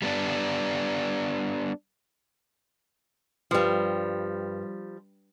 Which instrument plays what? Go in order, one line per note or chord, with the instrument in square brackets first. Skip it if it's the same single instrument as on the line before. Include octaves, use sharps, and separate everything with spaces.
[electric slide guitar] G3 B3 D4
[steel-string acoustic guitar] G2 [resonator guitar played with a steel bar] F3 G3